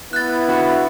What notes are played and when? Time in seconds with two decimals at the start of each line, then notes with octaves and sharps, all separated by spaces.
0.13 B3 E4 F#6 A6
0.48 D3 F#4